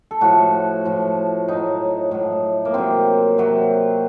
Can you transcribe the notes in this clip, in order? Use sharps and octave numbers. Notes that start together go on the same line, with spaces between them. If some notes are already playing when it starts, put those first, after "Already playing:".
A4
A2 F3 F#4
A2 F3
A2 F#3 D#4
A2 F#3
A#3
C3 F#3 C4
C3 F#3